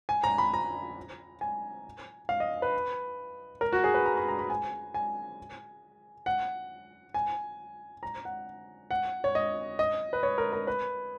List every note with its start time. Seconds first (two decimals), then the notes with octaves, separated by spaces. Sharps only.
0.09 G#5
0.24 A#5
0.38 B5
0.54 A#5
1.41 G#5
2.29 F5
2.40 D#5
2.62 B4
3.61 A#4
3.72 F#4
3.84 G#4
3.94 B4
4.06 A#5
4.17 B5
4.28 A#5
4.39 B5
4.50 G#5
4.94 G#5
6.26 F#5
7.14 G#5
8.03 A#5
8.25 F#5
8.91 F#5
9.24 C#5
9.35 D#5
9.79 D#5
10.13 B4
10.23 C#5
10.38 A#4
10.53 A#4
10.67 B4